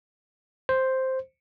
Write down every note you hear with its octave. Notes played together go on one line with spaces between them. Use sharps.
C5